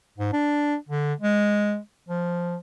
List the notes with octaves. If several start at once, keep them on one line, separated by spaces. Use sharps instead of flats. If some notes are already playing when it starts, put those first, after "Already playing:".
G#2
D4
D3
G#3
F3